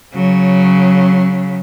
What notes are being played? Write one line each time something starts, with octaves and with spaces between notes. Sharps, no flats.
C#3 F#3